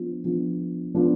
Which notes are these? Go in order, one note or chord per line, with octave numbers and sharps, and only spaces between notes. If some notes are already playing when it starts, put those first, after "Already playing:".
Already playing: F3 B3 D4 F4
F3 B3 D4 F4
F3 B3 D4 F4